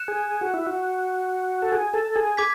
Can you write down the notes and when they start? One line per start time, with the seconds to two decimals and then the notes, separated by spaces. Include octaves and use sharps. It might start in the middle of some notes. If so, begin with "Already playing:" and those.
Already playing: F#6 C#7 E7
0.08 G#4
0.41 F#4
0.54 E4
0.67 F#4
1.62 A4
1.72 G#4
1.94 A4
2.16 G#4
2.37 D6 G#6 B6